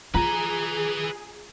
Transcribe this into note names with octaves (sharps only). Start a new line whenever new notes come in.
F4 G#4 B4 G#5 A#5